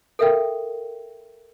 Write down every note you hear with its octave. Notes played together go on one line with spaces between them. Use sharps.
A4 A#4 E5 F5 G5